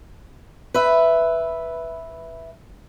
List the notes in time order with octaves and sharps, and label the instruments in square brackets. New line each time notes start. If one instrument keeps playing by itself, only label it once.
[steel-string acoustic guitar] B4 E5